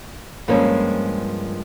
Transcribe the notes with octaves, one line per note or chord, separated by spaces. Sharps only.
G2 F3 G#3 A#3 C4 C#4